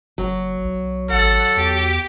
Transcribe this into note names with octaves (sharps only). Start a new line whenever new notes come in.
F#1 F#3
B1
G#1 A4 F#5
E2 G4